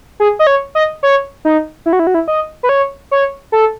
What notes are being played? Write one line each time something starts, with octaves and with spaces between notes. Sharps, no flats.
G#4
D#5
C#5
D#5
C#5
D#4
E4
F#4
E4
F#4
E4
D#5
B4
C#5
C#5
A4